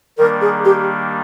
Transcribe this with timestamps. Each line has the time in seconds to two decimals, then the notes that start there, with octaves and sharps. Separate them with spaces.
0.18 D#3 G3 A#3 D4 A#4
0.41 G#4
0.65 G4